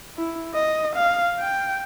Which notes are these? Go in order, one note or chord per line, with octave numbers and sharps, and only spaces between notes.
E4
D#5
F5
G5